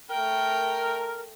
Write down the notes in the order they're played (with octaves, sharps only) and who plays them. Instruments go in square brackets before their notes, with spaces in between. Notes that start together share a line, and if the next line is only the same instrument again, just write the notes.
[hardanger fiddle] A3 G5 [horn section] A#4